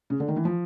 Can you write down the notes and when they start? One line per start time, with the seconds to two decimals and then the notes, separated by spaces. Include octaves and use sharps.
0.10 C#3
0.20 D3
0.28 D#3
0.36 E3
0.45 F3